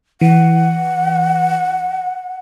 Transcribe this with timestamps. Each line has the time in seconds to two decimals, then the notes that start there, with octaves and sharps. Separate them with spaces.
0.21 E3 F#5